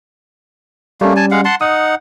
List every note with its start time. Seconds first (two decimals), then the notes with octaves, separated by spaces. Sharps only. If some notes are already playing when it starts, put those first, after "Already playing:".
1.01 G3 A3 A#3 C#4
1.16 G#5 A5
1.31 G#3 F5 F#5
1.45 F#5 A5 C6
1.61 D#4 F#5 D#6